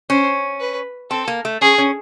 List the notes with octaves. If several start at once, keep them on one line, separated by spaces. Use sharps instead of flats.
C#4 C5
B4
C4 A4
A#3
A3
C#4 G#4
C#4